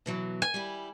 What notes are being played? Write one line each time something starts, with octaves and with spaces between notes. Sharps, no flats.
B2 E3 F#3
G#5
G3 E4 G4